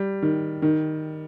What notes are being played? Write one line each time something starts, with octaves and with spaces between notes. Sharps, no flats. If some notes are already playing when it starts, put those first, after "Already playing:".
Already playing: G3
D#3
D#3